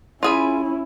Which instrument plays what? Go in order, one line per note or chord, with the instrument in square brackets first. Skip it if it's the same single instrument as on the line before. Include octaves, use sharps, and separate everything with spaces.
[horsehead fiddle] C#4 E4 [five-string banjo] F4 G#4 B5